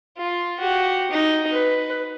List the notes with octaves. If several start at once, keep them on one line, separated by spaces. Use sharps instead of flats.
F4
F#4 G4
D#4
B4